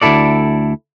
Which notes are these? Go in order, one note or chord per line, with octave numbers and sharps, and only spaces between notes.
D2 B2 E4 A4 D5